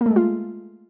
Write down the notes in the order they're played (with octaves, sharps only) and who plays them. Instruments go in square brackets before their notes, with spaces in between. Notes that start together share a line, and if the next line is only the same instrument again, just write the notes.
[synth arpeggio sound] A#3
A3
G#3
F4